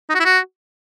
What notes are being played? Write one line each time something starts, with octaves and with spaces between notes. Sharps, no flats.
D#4
F#4
E4
F#4